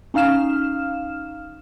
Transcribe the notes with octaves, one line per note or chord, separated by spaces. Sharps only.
C#4 D#4 F5 F6 E7